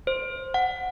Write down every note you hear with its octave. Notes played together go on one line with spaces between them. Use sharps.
C5
F#5